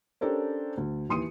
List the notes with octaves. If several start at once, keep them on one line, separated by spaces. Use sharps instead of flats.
C#4 D4 G4 A4 A#4 C5
D2
D#2 E3 C6 D#6 C#7 D#7